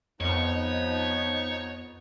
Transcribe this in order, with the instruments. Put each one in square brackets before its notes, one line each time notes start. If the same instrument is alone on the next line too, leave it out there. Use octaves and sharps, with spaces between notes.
[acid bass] F2 [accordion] F3 D#4 [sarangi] B3 [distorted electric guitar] C#5